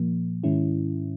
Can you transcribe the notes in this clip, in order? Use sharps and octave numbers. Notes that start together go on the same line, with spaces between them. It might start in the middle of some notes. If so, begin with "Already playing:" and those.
Already playing: A#2 F3 A#3
G#2 D#3 G#3 C#4 E4